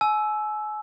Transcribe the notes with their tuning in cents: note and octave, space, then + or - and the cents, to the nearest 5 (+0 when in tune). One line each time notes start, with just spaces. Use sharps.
G#5 +35 E6 +0